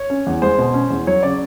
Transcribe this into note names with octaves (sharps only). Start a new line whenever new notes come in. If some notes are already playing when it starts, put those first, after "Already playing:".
Already playing: C#5
C#4
E2
G#3 C5
B2
C#4
E2
F#3 C#5
C#3 D5